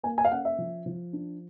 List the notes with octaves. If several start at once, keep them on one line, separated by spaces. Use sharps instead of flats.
A#3 G#5
G#5
F5
C#4 F#5
E5
F3
F3
D4